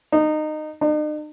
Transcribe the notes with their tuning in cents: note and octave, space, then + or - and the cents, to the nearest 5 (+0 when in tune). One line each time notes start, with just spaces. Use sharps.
D#4 -20
D#4 -45